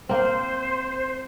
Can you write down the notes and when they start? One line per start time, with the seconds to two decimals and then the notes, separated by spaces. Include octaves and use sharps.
0.09 A#3 C4 C5